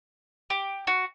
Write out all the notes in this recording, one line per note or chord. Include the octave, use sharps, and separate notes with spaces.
G4
F#4